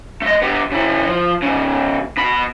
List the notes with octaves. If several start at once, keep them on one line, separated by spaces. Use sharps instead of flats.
A3 D#5
B3 G4
C#3 E4
F3
G#2 C#3
B2 B5